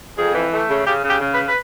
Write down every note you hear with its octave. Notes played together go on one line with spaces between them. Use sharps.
F2 G#4
E3
A3
C#3
C#3 G4
C#3
G4
C#3
B4
B4